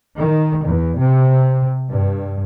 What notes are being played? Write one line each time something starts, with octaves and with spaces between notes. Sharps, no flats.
D#3
E2
C3
G2